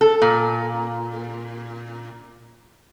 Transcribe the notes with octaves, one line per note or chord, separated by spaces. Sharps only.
A4
A#2